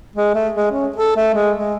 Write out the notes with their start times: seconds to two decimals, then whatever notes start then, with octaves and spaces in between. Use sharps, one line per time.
0.16 G#3
0.34 A3
0.55 G#3
0.72 C#4
0.96 A4
1.16 A3
1.34 G#3
1.58 G#3